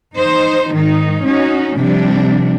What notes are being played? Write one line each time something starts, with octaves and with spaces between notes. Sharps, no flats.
D#4 C5
G#2 D#3 D#4
C#4 D#4 F#4
C3 F3 G3 D4